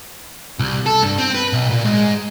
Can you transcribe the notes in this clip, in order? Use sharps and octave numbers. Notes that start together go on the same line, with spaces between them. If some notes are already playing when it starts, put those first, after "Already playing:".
C2
A4
G2
C4
B4
B1
A#2
G#2